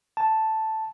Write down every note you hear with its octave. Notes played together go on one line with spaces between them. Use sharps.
A5